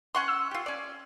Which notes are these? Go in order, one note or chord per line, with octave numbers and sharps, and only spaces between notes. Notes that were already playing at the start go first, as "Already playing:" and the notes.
C#4 F#5 C6 C#6
E6
F4 G4
C#4 D5